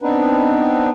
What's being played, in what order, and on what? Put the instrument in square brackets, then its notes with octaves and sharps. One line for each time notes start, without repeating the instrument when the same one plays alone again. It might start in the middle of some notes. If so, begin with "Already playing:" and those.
[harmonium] B3 C4 D4 D#4 B4